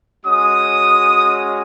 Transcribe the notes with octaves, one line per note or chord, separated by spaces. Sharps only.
G#3 C#4 F#4 D#6